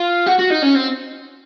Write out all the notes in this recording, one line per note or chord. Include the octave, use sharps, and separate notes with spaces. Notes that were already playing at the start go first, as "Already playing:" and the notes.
Already playing: F4
F#4
F#4
D#4
C#4
C4